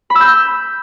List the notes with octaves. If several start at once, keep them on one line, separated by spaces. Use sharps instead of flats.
B5
E6
G6